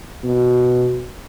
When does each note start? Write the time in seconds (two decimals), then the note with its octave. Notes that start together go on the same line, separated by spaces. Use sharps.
0.24 B2